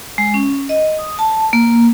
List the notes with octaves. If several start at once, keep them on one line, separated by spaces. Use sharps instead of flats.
G#3
C#4
D#5
D#6
A5
A#3